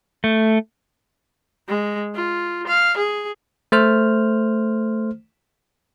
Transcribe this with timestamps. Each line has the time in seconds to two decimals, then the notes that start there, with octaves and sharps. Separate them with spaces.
0.24 A3
1.69 G#3
2.15 F4
2.67 F5
2.97 G#4
3.72 A3 C5 F6